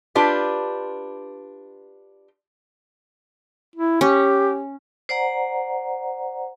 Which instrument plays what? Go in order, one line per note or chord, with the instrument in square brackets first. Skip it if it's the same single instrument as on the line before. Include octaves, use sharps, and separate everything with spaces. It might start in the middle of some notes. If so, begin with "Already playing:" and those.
[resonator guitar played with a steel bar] D4 F4 G4 B4
[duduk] E4
[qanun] C#4 [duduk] G4
[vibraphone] C5 D5 F#5 A#5